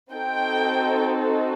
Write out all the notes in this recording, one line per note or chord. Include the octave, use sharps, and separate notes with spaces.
C4 D#4 F#4 A4 G5